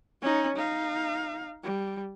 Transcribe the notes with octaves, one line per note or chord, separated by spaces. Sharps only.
C#4 D#4
D#4 F5
G3